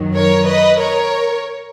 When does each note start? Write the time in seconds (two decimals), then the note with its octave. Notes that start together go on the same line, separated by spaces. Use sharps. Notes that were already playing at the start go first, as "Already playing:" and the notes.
Already playing: F#2 D#3 F#3
0.15 A#4 C#5
0.47 B4 D#5
0.79 A#4 C#5